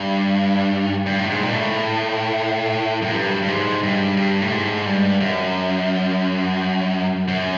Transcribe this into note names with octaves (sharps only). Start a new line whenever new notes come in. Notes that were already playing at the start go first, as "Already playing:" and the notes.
Already playing: G2
G2
A2
G#2
A#2
A2
F#2
G2
G2
G#2
G2
G2
A2
G#2
G2
F#2
F#2